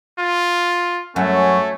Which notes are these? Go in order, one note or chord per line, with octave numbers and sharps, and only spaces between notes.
F4
F#2 A3 C#4 C#5